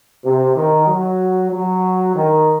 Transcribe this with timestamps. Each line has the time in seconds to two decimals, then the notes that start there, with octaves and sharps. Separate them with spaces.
0.24 C3
0.56 D#3
0.87 F#3
1.52 F#3
2.15 D#3